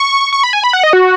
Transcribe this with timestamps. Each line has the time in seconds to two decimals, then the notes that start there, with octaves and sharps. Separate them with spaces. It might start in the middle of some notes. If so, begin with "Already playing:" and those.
Already playing: C#6
0.33 C#6
0.43 B5
0.53 G#5
0.64 B5
0.73 F#5
0.83 D#5
0.93 F#4